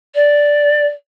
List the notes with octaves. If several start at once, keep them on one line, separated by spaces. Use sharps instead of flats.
D5